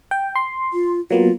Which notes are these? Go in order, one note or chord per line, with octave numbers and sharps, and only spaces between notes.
G5
C6
F4
F#3 A#3 B3 F4